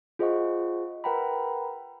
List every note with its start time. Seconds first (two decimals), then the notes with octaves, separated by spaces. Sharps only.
0.19 F4 G#4 C5 D#5 F#5 C#6
1.04 A#4 B4 F#5 G5 A#5 B5